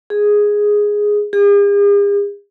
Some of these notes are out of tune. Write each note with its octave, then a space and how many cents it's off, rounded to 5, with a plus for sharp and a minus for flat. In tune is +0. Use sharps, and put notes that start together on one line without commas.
G#4 -5
G#4 -45